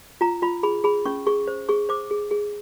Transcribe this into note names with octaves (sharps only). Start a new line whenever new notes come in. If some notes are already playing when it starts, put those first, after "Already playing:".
F4 A#5
F4 B5
G#4 B5
G#4 B5
C#4 C#6
G#4 C#6
C5
G#4 C#6
C5 D6
G#4
G#4